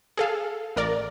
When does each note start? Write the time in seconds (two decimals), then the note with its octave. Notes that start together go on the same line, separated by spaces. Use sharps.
0.17 G#4 A4 F5
0.76 A1 A#4 D5